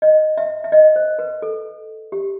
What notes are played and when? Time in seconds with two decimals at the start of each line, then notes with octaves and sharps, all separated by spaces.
0.02 D#5
0.37 E5
0.64 E5
0.72 D#5
0.96 C5
1.19 B4
1.42 A4
2.12 G4